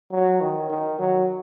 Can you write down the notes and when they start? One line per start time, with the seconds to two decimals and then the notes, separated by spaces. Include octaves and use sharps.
0.12 F#3
0.41 D#3
0.70 D#3
0.99 F#3